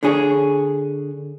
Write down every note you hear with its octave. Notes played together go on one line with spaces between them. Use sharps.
D3 D4 G#4 C#5